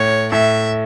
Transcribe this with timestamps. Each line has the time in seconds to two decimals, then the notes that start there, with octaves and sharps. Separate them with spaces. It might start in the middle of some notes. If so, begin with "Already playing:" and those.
Already playing: A2 C#5
0.32 A2 E5